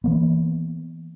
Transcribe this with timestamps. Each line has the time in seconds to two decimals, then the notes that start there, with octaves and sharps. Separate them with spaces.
0.04 E3 A#3 B3